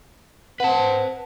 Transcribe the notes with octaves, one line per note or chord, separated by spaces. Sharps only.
C4 B4 F#5 A5